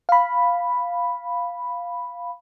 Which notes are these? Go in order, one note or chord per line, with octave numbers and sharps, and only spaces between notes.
F5 B5